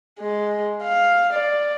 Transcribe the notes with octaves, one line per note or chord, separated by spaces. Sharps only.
G#3
F5
D5